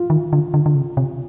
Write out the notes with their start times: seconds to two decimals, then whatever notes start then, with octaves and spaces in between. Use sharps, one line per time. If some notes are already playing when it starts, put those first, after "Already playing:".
Already playing: F4
0.10 D#3
0.33 D3
0.54 D3
0.66 D3
0.75 C#3
0.97 C3